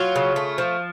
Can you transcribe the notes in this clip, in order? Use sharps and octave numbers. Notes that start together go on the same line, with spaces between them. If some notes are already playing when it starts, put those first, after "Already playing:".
Already playing: F#3 F4
C#3
A3
F3